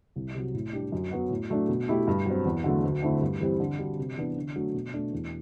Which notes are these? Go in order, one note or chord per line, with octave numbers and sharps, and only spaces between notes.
C2
C3 F#3
A2
G3 D4 G4
F#2
F#3 B3 F#4
A2
F#3 A3 D4
B2
A3 E4 G4
G2
F#3 C4
E2
D3 F#3 A3
D2
D3 A3 C4 E4
G2
E3 G3 C4 G4
D3
G3 D4 F#4
C3
E3 B3 D4
D3
F#3 A3 D4
B2
A3 D4 F#4
E2